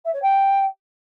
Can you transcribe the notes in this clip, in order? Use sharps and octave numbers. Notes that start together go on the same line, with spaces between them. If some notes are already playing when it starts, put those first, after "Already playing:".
E5
C#5
G5